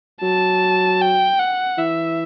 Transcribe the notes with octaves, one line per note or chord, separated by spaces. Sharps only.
F#3 A5
G5
F#5
E3 E5